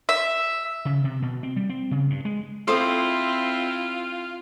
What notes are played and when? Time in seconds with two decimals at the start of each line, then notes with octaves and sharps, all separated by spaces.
0.09 E5
0.85 C#3
1.04 C3
1.22 B2
1.43 C4
1.56 G3
1.69 C4
1.91 C#3
2.10 G2
2.25 G#3
2.68 C4 E4 F4 A4 C5 D6 D#6